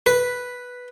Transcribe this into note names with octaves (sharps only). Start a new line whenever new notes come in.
B4